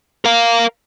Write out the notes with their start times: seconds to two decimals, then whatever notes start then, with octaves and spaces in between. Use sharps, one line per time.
0.25 A#4 F5